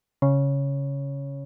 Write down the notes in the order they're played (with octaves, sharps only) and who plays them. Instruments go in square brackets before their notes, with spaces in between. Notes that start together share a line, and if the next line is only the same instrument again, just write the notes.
[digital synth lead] C#3